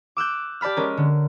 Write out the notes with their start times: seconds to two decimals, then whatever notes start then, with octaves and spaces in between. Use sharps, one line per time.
0.17 D6 E6 F#6 G6
0.61 G4 D5 A5 B5 F6
0.76 G#3 C#4 A#4
0.97 D3